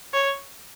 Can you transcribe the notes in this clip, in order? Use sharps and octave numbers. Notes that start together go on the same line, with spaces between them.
C#5